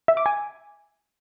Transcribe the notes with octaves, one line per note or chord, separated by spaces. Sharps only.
E5
D6
G#5